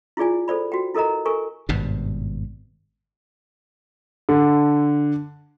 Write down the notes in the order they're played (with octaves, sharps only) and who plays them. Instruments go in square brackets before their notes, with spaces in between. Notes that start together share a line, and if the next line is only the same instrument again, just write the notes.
[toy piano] E4 F4 G#4 D5 G#5
A4 C5 D5 B5
F#4 G5
E4 A4 A#4 D#5 A#5
A4 A#4 G#5 C#6
[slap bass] G#1 G2 B2
[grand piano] D3